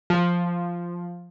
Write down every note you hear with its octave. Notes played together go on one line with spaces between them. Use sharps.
F3